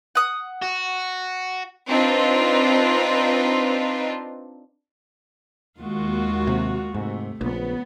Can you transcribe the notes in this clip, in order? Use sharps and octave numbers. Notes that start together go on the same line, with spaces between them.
F#5 D#6
F#4
C4 D4 D#4 F4 B4
D#2 G#3 F4 F#4
C3
G#2 C3 A3
A#1 C#3 B3